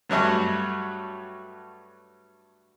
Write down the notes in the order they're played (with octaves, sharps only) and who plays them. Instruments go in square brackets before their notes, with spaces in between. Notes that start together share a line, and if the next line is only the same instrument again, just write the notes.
[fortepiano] G2 F#3 G3 A3 F#4